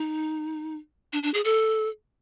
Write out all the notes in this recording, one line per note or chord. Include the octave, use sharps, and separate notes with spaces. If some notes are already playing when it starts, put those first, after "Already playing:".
Already playing: D#4
D4
D4
G#4
A4